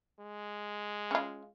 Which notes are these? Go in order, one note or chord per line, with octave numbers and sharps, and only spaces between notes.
G#3
C#4 F4